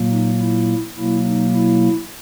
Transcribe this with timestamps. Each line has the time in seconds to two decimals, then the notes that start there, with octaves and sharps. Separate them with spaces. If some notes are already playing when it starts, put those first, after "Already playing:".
Already playing: A#2 F#3 A#3
0.11 D#4
0.40 E4
0.97 B2 F#3 A#3 E4
1.25 D#4
1.54 E4